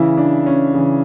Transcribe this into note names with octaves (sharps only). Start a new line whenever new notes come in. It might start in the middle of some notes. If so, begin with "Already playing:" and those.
Already playing: C#3 E3 E4
D4
C#4
C#3 E3